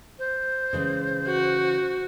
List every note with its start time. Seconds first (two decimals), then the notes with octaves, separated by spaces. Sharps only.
0.19 C5
0.73 C#3 E3 G#3
1.27 F#4